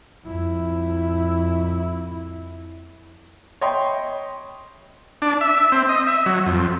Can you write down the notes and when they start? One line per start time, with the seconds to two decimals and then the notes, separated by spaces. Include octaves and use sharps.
0.24 F2 E4
3.61 C#5 D#5 E5 G5 B5 C6
5.22 D4
5.41 E5
5.72 C4
5.89 D#5
6.07 E5
6.26 F#3
6.46 F2